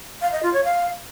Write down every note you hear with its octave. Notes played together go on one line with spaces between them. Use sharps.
F5
D#5
F4
C#5
F5